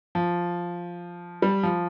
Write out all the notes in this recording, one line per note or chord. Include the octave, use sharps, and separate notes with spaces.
F3
G3
F3